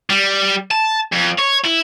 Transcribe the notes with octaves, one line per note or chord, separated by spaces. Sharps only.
G3
A5
F2
C#5
E4